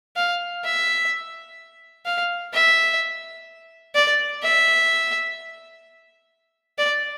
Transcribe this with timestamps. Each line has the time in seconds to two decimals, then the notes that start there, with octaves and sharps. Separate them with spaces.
0.16 F5
0.64 E5
2.06 F5
2.53 E5
3.95 D5
4.43 E5
6.79 D5